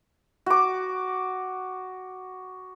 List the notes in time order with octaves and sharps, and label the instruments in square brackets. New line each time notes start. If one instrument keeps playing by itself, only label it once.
[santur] F#4 D6